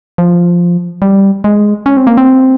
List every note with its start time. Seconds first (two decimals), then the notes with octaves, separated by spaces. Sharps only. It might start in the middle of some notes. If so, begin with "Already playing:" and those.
0.18 F3
1.02 G3
1.44 G#3
1.86 C#4
1.97 C4
2.07 A#3
2.17 C4